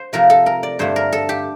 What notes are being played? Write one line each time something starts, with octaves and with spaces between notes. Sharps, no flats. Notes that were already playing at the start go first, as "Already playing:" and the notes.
Already playing: C5
C3 F3 A3 A#4
A4
A#4
D5
G2 D3 A3 C5
A#4
A4
G4